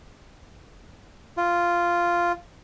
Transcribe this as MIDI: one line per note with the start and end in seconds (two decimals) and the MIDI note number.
1.38 2.32 65